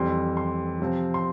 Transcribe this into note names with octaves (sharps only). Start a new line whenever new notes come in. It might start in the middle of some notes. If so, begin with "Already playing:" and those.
Already playing: F2 E3 G3 C4 C6
C6
C3 F3 C4
C6